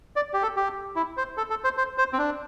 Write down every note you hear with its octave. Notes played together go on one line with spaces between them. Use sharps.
D5
G4
A4
G4
E4
C5
A4
A4
C5
C5
C5
C4
D4